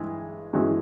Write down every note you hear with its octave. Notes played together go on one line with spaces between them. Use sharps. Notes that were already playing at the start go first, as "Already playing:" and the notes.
Already playing: G2 E3 G#3
G2 E3 G#3 C#4 F#4